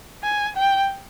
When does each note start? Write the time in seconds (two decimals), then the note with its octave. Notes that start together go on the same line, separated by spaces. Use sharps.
0.23 G#5
0.56 G5